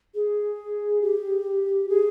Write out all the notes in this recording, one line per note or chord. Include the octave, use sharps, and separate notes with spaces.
G#4
G4
G#4